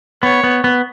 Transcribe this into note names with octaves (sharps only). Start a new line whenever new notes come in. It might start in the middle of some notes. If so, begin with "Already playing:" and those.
B3 C#5
B3
B3